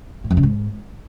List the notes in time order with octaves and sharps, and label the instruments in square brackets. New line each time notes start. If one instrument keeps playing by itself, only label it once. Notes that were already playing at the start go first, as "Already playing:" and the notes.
[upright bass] A2
F2
C#3
G#2